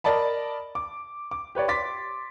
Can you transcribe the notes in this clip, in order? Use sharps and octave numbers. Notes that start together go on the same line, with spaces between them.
A#4 D5 D#5 A5 B5
D6
D6
G4 B4 C#5 D5
C6 D6 A6 B6